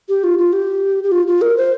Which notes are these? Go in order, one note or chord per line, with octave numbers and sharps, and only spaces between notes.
G4
F4
F4
G4
G4
F4
F4
A#4
C5